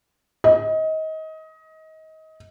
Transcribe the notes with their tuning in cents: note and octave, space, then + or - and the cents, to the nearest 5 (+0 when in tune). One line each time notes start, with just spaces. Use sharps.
D#5 +25